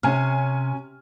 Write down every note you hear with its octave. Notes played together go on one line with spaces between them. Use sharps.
C3 C#4 G#5 F6